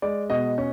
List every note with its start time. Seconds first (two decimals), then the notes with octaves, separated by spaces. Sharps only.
0.02 G#3 D5
0.30 B2 D#5
0.58 C#4